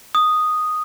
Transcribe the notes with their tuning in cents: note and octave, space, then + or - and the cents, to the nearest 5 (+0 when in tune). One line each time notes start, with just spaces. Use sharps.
D#6 -5